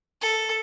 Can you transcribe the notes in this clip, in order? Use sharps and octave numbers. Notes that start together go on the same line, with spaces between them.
A4